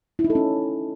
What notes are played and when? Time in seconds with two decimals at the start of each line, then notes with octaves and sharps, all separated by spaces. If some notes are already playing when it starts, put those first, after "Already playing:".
0.19 E4
0.24 D#4
0.30 A4
0.35 C#4